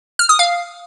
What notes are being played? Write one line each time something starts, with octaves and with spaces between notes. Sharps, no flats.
F6
D#6
F5